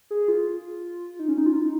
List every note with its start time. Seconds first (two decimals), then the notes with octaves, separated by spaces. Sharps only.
0.11 G#4
0.28 F4
1.19 D#4
1.29 C#4
1.38 D#4
1.46 F4
1.55 D#4